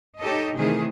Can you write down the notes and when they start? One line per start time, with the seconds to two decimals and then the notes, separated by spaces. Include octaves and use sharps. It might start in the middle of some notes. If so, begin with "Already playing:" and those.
0.19 D#4 G4 A4 C#5 D#5
0.57 C3 D#3 E3 A3 G#4